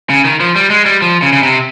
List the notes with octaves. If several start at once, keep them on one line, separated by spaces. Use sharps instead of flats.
C#3
D#3
F3
G3
G#3
G3
F3
C#3
C#3
C3